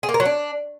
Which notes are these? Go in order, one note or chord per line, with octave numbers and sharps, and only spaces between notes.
G#4
A#3
A#4
F#3
D4